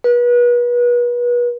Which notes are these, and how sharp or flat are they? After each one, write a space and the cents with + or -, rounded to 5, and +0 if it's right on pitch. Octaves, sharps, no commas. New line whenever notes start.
B4 -35